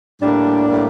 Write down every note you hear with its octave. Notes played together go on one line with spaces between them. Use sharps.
A2 G3 A#3 D4
A2 G3 A#3